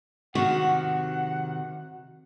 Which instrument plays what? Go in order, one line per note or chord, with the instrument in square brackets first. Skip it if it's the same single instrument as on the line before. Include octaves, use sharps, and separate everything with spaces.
[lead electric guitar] C3 D#3 [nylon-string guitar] F#4 [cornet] F#5